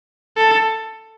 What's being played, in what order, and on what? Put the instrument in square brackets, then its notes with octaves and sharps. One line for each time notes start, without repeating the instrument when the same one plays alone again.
[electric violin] A4